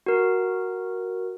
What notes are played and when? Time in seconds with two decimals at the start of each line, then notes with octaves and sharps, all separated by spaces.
0.06 F#4 A#4